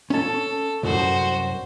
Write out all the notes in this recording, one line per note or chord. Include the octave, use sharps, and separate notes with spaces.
C#4 A4 A5
C2 F#2 F#4 C5